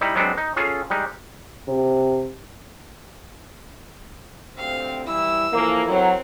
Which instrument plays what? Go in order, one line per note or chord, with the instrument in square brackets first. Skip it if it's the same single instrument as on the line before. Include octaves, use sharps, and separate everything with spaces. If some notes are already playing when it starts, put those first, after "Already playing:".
[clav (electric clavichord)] G3 D#4 E4
F#3 G#3 B3 C4 D4 F#4
D#4
C#4 F4 G#4 A4
G3 G#3 D#4
[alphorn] C3
[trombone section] D2 C3 C4 [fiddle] F5
[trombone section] E3 G3 E4 [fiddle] E6
[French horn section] E3 F3 A#3 [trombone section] E4 A4 A#4
[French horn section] F#3 [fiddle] C4